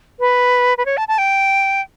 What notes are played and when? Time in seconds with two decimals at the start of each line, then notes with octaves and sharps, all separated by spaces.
0.20 B4
0.78 B4
0.86 C#5
0.97 A5
1.08 A5
1.18 G5